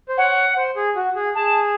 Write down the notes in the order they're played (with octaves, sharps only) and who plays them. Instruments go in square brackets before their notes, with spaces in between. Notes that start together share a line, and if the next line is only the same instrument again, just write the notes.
[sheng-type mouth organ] C5
[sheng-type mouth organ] C#5 [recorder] F#5
[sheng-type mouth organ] C5
G#4
F#4
G#4
[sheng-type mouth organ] G#4 [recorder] A5